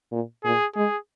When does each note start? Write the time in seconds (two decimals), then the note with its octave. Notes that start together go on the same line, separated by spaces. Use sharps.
0.12 A#2
0.44 A#2 G#4
0.75 G#3 G#4